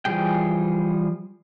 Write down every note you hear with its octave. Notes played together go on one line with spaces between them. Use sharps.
E3 F3 G3 G#4 G5